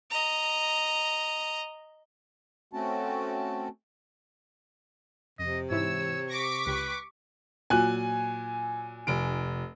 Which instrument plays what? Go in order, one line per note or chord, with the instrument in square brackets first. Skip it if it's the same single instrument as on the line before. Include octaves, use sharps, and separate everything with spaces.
[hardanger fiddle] D#5 A#5
[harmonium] A3 C4 C#4 F#4 A5
[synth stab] F2 [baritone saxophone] C3 [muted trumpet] D#5
[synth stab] G#2 E3 E4 [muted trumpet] C#5 [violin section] E6
[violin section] C#6 D6 B6 [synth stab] A#6
[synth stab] C#2 G4 [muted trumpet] B4
[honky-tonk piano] A#2 F#3 [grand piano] G#5 F#6
[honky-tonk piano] F1 D7